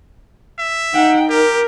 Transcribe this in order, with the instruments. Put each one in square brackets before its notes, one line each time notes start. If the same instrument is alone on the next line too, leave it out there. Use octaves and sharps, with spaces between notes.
[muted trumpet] E5
[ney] D#4 [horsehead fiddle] F#5 G5
[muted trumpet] G4 [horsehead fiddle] A#4